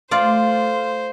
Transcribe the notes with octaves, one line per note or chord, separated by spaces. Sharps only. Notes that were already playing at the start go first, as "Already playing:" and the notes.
A3 F4 C5 D5